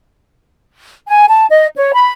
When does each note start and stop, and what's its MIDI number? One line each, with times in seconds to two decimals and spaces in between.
1.08 1.26 80
1.28 1.45 81
1.49 1.67 75
1.76 1.91 73
1.94 2.12 83